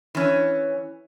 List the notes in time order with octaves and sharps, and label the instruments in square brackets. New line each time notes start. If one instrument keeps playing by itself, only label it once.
[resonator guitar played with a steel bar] E3 C#4